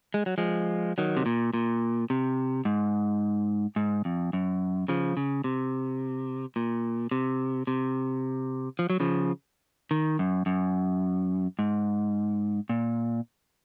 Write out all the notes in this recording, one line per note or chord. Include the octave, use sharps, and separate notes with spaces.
G#3
F#3
F3 G#3
D#3 F#3
C3
A#2
A#2
C3
G#2
G#2
F2
F#2
C#3 F3
C#3
C3
A#2
C3
C3
F3
F#3
C#3 F3
D#3
F#2
F#2
G#2
A#2